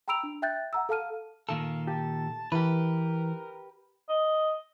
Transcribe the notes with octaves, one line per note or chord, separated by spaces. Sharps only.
G5 A#5 B5 E6 D7 F7
D4
E5 G5 F#6 G6 A6
F#5 A#5 E6
A4 F5 A5 F6 D#7
A#2 D#3 A4 F5
G4 A5
E3 G4 A#4 B4
D#5